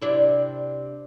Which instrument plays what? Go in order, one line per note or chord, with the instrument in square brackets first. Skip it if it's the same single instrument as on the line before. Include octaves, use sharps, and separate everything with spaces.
[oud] C3 D4 E4